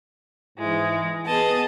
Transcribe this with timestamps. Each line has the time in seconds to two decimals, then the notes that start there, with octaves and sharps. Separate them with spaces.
0.58 G#2 E3 G#3 E4
1.25 B3 G#4 D#5 A5